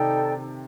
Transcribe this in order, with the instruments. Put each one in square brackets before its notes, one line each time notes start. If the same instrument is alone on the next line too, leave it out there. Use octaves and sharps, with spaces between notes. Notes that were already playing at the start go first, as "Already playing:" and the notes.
Already playing: [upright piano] C3 D#3 [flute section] D#4 A4 D5 G5